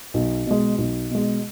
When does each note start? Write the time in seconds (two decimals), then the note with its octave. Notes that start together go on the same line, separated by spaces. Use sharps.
0.14 B1
0.46 B2 G#3
0.78 B1
1.10 B2 G#3